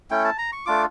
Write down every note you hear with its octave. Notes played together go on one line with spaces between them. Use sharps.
A3 C#4 E4 G5
A5
A#5
C#6
A3 D4 F4 D6